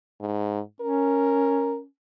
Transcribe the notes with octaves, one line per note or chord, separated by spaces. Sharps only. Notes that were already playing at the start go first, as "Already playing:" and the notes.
G#2
C#4 A#4